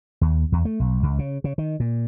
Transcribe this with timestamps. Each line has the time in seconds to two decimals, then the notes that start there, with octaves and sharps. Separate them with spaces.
0.21 D#2
0.52 E2
0.65 A3
0.80 B1
1.03 C#2
1.19 C#3
1.44 C#3
1.58 D#3
1.80 A#2